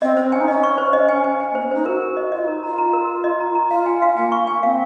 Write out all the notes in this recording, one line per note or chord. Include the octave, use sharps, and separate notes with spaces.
C4 D#5
C4 C5
C#4 G#5
D#4
C#4 D#5
C#6
C5
D#5
G#5
G#5
G#5
A#3 C5
C#4
D#4 C5
F#4 A#4
A#4
D#5
F4 D#5
D#4 A#4
F4 A#5
A#5
A#4
A#4
D#5
A#5
A#5
F4 F5
G#5
F5
A#3 G#5
C#6
G#5
C4 F5